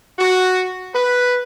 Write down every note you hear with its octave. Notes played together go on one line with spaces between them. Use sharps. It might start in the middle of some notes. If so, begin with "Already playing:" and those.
F#4
B4